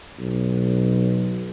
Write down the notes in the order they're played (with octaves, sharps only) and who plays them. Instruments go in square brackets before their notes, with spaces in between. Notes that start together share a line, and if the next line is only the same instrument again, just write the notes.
[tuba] B1